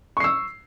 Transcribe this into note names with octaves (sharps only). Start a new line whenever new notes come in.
C#6 E6 C7